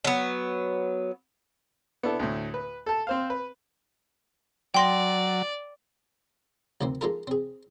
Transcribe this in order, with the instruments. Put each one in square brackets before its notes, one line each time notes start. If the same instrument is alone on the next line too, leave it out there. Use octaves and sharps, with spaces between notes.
[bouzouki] F#3 B3
[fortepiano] B3 D4 E4 A4
D2 A2
B4
A4 A5
C4 C5 F5
B4
[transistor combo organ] F#3 [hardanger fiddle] D5 [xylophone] G5 C6 A#6
[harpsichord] D2 D#3 A#3 C4
G#3 A#3 D#4 F4 A4 A#4
C4 G#4